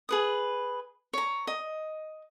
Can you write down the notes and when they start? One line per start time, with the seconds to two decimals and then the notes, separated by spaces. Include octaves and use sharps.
0.09 G#4 B4 D#6
1.13 C#5 A#5
1.47 D#5